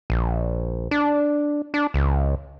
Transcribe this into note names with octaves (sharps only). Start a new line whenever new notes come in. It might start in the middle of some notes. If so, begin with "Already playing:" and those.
A#1
D4
D4
C#2